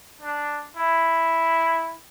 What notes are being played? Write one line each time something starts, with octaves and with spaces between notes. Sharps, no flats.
D4
E4